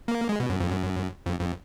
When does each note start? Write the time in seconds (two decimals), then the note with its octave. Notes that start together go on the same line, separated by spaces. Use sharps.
0.08 A#3
0.29 G#3
0.40 B2
0.49 F#2
0.60 F2
0.70 F#2
1.26 F2
1.39 F2